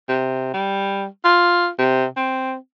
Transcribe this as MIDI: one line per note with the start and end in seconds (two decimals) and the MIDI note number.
0.09 0.52 48
0.54 1.06 55
1.25 1.69 65
1.78 2.05 48
2.17 2.55 60